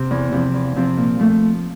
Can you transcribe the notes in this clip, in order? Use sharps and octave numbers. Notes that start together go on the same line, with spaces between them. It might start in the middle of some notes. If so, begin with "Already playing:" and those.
Already playing: C3 C4
E2
C3 F3 C4
E2
C3 F3 C4
A#2
F3 A3